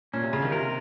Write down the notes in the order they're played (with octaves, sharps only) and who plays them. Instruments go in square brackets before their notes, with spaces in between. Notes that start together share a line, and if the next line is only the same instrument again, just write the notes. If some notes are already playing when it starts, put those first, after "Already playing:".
[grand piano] A#2 [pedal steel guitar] C#4
[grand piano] C3
[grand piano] C#3 [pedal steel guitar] F4
[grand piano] D#3
[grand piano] C3 [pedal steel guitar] A#4